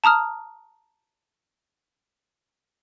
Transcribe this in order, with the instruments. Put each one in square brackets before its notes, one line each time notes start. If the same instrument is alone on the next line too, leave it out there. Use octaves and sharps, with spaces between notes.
[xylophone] A5 A#5 D#6 F6